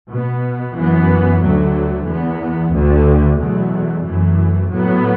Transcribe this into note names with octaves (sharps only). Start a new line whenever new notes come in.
B2 B3
F#2 E3 B3
D2 D3 F#3 A3
E2 E3 B3
D2 D3 A3
E2 B2 F#3 A3
F#2 E3 A3
A2 F#3 B3